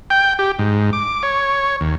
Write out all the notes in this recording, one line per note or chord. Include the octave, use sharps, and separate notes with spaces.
G5
G4
G#2
D6
C#5
D#2